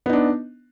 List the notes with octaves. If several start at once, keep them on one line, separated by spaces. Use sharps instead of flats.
B3 D4 D#4